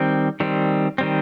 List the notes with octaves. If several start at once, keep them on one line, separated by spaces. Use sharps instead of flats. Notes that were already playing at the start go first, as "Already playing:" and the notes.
Already playing: D#3 G3 C4
D#3 G3 C4
D#3 G3 C4